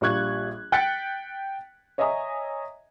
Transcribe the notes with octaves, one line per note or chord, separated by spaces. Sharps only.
A#1 G3 F4 C#6 F#6 G#6
G5 F#6 A6 B6 C#7 D7
C#5 D#5 E5 G#5 A#5 D#6